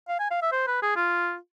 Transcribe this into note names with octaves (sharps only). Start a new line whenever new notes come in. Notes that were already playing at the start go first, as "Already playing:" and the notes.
F5
G#5
F5
E5
C5
B4
G#4
F4